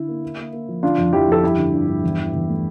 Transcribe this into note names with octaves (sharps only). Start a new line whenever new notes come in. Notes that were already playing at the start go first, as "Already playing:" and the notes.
Already playing: D3 E4
A#3
A#3
A#3
A#3
F3
D3 D4 F4
F2
F2 E4 G4
F2 A4
G2 E4 G4
D3
G2
G2
E2
E3
E2
A3